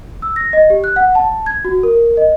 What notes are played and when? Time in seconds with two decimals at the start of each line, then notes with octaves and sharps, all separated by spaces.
0.22 E6
0.36 A#6
0.53 D#5
0.70 G4
0.84 F#6
0.96 F#5
1.15 A5
1.46 G#6
1.65 F#4
1.83 A#4
2.17 D#5